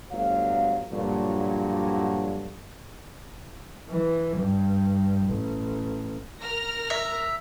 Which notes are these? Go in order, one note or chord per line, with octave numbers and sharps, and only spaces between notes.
G1 D2 F#3 F5
G2 A#2 D3 F3 F#3
E3
G2
A1
A#4 F6 A#6
E5